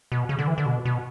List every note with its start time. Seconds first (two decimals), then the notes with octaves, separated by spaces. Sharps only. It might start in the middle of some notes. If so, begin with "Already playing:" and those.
0.12 B2
0.29 C#3
0.39 D3
0.47 E3
0.58 D3
0.66 B2
0.85 B2